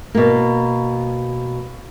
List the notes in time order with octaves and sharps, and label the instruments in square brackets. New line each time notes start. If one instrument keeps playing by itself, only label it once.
[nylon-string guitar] B2 A#3